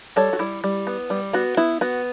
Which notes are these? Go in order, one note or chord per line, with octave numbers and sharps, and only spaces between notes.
G3 A4 C#5
F#4
G3 E4
G3
B3
G3
B3 F#4
B3 E4
B3 F#4